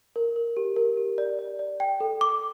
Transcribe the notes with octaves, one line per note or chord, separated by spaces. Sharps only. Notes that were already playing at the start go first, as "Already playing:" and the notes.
A#4
A#4
G4
A#4
G4
D5
D5
D5
G5
A4
D6